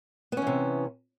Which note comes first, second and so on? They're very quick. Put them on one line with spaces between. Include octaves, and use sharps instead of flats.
B3 C#4 E3 C3